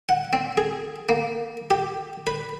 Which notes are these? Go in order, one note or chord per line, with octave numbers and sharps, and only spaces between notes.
F#5
C4
G#4
A#3
G4
B4